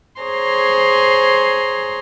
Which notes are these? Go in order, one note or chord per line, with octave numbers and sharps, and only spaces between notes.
G#4 C5 C#5 A#5 C6